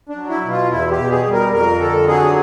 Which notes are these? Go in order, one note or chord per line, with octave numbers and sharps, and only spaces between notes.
D4
F#3
E4
B2
F4
E2 E4
G4
B2
G#4
G3
A#4
F2 A#4
D3 A4
F#3 G#4